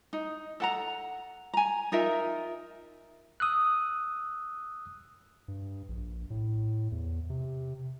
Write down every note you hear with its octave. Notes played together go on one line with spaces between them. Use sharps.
D#4
A4 F#5 A#5
G#5 A#5
D#4 F4 A#4 E5
D#6 E6 F#6
G2
A#1
A2
E2
C3